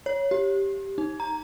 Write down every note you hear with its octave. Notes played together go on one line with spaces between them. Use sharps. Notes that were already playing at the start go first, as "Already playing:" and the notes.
C#5
G4
D#4
A#5